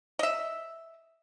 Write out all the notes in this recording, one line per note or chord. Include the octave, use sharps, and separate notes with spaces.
D#5 E5